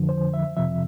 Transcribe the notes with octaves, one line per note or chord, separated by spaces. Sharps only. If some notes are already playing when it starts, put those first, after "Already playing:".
Already playing: F2 D3 F3
C5
E5
F2 C3 F3 E5